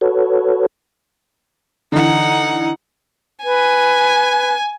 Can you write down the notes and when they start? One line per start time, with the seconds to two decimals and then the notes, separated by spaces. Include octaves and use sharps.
0.01 F#4 A4 B4 C#5
1.92 D3 E3 D#4 F#5
3.44 B4 G#5